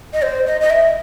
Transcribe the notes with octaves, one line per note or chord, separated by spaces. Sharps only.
D#5
C5
D#5
D#5
E5